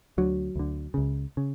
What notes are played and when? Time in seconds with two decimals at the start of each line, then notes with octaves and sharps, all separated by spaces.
0.18 D2 D3 F#3
0.56 D2 D3
0.94 C#2 C#3
1.37 C#3